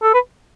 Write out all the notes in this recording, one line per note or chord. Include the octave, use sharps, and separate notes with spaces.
A4
B4